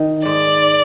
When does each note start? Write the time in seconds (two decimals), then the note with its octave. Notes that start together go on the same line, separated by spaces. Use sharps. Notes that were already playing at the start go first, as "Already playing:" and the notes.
Already playing: D#3
0.25 G#2 D5